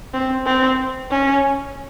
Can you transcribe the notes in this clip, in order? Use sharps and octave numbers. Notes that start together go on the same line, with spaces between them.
C4
C4
C#4